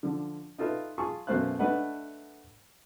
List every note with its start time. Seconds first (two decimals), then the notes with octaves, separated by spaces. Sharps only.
0.03 D3 F3
0.58 D#4 F4 A4 B4 E5
0.98 F4 G#4 A5 C#6
1.27 F#2 B2 A3 C5 F5 F#6
1.59 A3 D4 B4 D#5 F#5